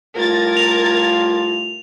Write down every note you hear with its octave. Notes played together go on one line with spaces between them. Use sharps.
A2 G3 F4 A#4 G#6 A6
F7